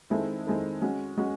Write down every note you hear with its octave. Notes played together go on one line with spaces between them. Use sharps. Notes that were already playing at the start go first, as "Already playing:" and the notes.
D#3 G#3 C4 E4 A4
D#3 G#3 C4 E4 A4
G#3 C#4 F#4
G#3 C#4 F#4